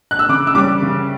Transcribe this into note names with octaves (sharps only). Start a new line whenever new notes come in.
F#6
E6
C#3 D6
E6
G3 C#4 D6
C#3